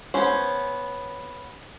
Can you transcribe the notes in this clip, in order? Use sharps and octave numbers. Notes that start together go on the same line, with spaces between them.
B3 C#4 C5